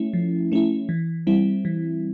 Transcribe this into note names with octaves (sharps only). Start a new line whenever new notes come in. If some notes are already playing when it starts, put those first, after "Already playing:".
Already playing: A3 C#4 E4
F3
A3 C#4 E4
E3
G3 C4 E4
E3